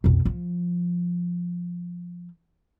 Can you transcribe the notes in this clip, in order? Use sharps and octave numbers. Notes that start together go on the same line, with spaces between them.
B1 F2
F3